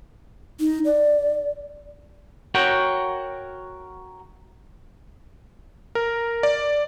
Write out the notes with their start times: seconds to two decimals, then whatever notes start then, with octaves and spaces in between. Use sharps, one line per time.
0.60 D#4
0.85 D5
2.55 F#4 A#4 C#5 F#5 G5
5.95 A#4
6.43 D5